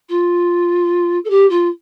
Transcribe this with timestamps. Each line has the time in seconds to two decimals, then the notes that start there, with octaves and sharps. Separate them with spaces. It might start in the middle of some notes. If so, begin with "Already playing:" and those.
0.08 F4
1.24 A4
1.29 G4
1.49 F4